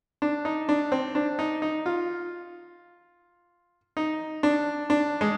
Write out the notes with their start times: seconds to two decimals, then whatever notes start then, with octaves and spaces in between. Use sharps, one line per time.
0.22 D4
0.45 D#4
0.69 D4
0.92 C4
1.15 D4
1.39 D#4
1.62 D#4
1.86 F4
3.97 D#4
4.43 D4
4.90 D4
5.21 G#3